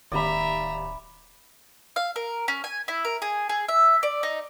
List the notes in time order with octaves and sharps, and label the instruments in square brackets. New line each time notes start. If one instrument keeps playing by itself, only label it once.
[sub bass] D1 [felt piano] G#1 D#2 G4 [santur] D5 B5 [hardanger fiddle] E5 A#5
[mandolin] F5
A#4
C#4
G#5
E4
A#4
G#4
G#4
E5
D5
D#4